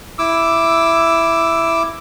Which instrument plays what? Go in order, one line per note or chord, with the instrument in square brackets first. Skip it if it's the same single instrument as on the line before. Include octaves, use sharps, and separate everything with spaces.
[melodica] E4 D6 E6